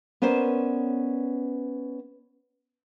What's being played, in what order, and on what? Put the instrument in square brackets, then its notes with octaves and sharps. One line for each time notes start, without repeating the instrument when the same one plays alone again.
[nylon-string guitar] B3 C#4 A#4 C5 D5